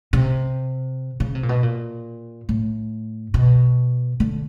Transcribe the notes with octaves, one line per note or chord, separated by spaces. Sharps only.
C3
C#3
C3
A#2
B2
A#2
A2
B2
D3